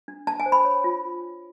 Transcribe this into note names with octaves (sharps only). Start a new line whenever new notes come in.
D4
D4 A5
G#5
C5
B5
C#5
F4